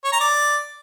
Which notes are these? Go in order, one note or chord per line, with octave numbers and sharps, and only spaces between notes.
C#5
A#5
D5